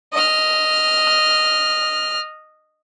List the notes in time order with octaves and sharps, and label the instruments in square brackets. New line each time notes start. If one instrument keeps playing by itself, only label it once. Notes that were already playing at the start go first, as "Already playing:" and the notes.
[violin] D#5 F6